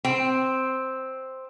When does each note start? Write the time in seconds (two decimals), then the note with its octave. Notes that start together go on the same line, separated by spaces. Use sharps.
0.05 C4